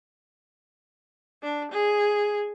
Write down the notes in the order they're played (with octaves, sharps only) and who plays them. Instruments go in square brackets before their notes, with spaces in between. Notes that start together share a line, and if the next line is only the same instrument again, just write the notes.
[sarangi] D4
G#4